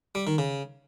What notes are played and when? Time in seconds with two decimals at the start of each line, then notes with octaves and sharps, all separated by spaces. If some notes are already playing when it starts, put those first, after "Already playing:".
0.15 G3
0.27 D#3
0.38 C#3